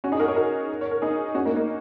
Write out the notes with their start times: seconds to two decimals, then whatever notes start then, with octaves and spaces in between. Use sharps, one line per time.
0.04 C#4 F#4
0.12 D#4 G#4
0.20 F#4 A#4
0.28 G#4 C#5
0.36 F#4 A#4
0.81 C#5
0.91 A#4
1.02 D#4 G#4
1.35 C#4 F#4
1.45 A#3 D#4
1.56 A#3 D#4